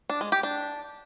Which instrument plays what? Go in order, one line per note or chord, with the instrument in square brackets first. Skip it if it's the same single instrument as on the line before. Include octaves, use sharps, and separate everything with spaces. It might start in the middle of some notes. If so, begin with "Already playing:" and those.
[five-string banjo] D4
G#3
G4
D4